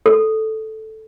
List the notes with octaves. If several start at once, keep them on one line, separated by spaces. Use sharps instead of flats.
A4